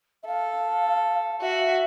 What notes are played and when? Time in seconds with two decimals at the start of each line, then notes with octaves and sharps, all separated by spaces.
0.23 E5
0.27 A4 F5
1.42 F#4 E5